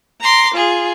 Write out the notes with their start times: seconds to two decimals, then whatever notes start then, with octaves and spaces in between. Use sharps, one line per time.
0.20 A#5 C6 D6
0.53 F4 G#4